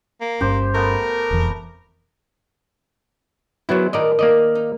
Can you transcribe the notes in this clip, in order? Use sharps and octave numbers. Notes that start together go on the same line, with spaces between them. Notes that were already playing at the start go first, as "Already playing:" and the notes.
A#3
G1 G2 C#4 G4 C5
A3 B3 A#4
E1 F2 E3
F#3 B3 E4 G#4 C5
A2 D#3 A#4 D5 D#5
D#3 A#3 D5 D#5
D#4